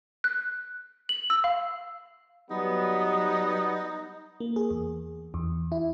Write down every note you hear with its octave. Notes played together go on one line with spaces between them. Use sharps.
F#6
F#7
E6
F5
F#3 G3 B3 D#4
A#3
G#4
E2
E2
E4